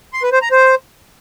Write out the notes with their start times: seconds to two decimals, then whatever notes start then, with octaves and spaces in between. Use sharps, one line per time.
0.13 C6
0.23 B4
0.32 C5
0.42 A#5
0.51 C5